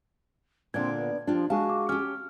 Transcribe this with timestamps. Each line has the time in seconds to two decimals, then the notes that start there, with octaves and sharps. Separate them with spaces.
0.74 A#2 D3 C4 D4 D5 G#6
0.97 B3
1.27 F3 D4 F4 G4
1.50 G#3 D4 F#4 G#4 F5 A5
1.69 D6
1.89 C#4 G4 F6